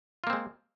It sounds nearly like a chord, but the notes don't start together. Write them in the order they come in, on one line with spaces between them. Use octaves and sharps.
F4 A#3 C4 G#3